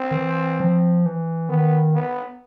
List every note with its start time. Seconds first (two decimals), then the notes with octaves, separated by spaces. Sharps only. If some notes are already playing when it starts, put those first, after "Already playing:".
Already playing: C4
0.11 D#3
0.15 E3
0.60 F3
1.06 E3
1.49 D#3 B3
1.94 B3